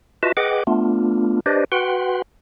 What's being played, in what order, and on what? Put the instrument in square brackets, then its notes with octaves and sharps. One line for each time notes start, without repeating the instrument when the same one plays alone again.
[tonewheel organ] F4 F#4 B4 D#5 E5 A5
G#4 B4 D#5 F#5 G5 D6
A3 B3 D4 F4
D4 G4 B4 C5 D5 D#5
F#4 B4 F#5 G5 C6